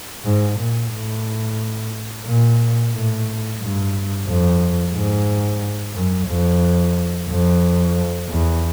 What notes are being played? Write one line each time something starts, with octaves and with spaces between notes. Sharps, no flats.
G#2
A#2
A2
A#2
A2
G2
F2
G#2
F#2
F2
F2
E2